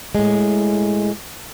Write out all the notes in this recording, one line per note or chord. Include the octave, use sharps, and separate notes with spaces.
A2 G#3